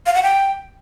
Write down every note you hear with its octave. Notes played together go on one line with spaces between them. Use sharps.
F5
F#5
G5